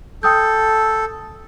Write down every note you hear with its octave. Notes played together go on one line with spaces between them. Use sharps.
A4 G5 D#6 G6